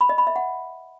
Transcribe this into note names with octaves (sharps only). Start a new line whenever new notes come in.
B5
D#5
B5
E5
F#5